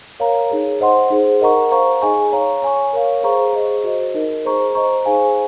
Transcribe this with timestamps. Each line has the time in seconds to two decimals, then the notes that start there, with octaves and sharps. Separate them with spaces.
0.20 A#4 C#5 F5 A#5
0.50 D#4 G#4 C#5
0.80 C5 D#5 F#5 C6
1.11 D#4 G#4 C5
1.41 A#4 D#5 F#5 A#5 C#6
1.71 C5 F5 A#5 C#6
2.02 D#4 G#4 D#5 G#5 C#6
2.32 C#5 F5 A#5
2.62 C#5 G#5 C#6
2.93 A#4 C#5 F5
3.23 G#4 C5 F5 A#5 C#6
3.53 G#4 C5 D#5
3.84 F#4 C5 D#5
4.15 D#4 A#4 D#5
4.45 G#4 C5 D#5 A#5 C#6
4.75 C5 D#5 A#5 C#6
5.05 D#4 G#4 C5 F5 G#5